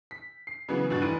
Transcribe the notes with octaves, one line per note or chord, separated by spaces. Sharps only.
B6
C7
C#3 E3 F#3 B3
G2 B2 B3 F#4 F#6 A6
F1 E3 D#7